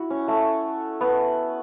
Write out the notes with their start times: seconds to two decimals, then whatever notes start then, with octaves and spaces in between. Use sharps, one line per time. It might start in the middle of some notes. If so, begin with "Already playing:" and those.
Already playing: E4 F#4
0.10 C#4
0.28 A3
1.01 B3